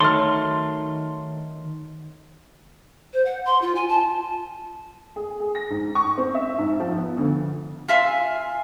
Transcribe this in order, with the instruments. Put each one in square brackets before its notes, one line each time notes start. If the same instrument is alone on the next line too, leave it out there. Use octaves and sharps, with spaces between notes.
[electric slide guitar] D#3 D#4 A#4 [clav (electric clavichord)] F#3 A3 [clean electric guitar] C6 [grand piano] F6 A6
[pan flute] C5
F#5
C6
F4
G#5
A5
[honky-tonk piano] G#4
G#4
A#6
G#2
C#6
C4
E5
G#2
F3
B3
D2
[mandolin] F4 E5 G#5 C6